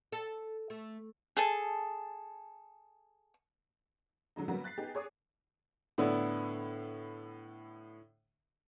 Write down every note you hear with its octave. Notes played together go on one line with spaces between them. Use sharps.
A4
A3
G#4 A4 A5
D3 F#3 G#3 D#4
D3 F#3 G3 A#3 B3 F#4
F#6 A6 B6 C7
B3 D#4 G4 G#4
G#4 C#5 D6 D#6
A2 D3 B3 D4 E4